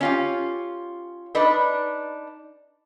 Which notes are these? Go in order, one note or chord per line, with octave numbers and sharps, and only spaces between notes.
C#4 F4 G4
D4 D#4 B4 D5